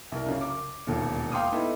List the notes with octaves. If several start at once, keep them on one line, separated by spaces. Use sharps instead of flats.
C2 A#4
F#2 C#3
D6
E1 D#2 A#2
F5 G5 C6 D6 D#6
B3 D#4 E4 A4